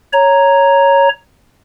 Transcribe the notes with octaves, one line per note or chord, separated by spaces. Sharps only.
C#5 A#5